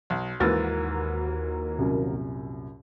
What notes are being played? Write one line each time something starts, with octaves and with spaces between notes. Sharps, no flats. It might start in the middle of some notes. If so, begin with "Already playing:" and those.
B1
D#2 G#2 E3 A#3 F#4 A#4 B4 A6
C2 F#2 A#2